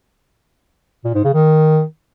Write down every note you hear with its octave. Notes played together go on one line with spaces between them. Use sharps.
A#2
G#2
C#3
D#3